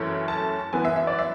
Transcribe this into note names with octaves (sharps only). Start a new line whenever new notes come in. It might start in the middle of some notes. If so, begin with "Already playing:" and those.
Already playing: F#2 E3 A3 C#4
A5
F#2 E3 B3 G#5
E5
E5
D5
E5